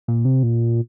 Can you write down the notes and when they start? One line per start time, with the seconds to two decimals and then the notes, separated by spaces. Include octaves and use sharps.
0.08 A#2
0.25 C3
0.43 A#2